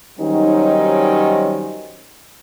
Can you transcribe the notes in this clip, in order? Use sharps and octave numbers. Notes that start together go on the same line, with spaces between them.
D#3 F#3 G3 C4 C#4 D#4